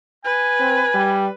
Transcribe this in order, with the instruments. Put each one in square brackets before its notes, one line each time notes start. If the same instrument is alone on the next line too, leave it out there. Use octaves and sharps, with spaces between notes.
[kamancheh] B4 [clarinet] G#5
[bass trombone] C4
G3